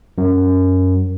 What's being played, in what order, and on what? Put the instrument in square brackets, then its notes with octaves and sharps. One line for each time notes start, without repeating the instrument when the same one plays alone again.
[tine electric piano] F#2